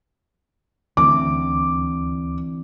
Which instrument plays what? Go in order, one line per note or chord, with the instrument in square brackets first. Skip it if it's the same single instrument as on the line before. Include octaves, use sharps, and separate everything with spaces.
[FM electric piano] D2 [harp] D3 E3 C4 [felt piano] D6